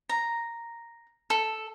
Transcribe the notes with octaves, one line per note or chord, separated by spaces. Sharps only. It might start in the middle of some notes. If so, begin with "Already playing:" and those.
A#5
A4